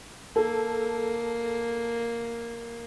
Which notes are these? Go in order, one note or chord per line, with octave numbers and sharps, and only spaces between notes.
A#3 A4